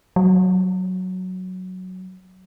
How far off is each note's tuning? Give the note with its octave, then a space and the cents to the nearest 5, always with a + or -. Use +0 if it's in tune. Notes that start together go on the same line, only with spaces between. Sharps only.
F#3 +0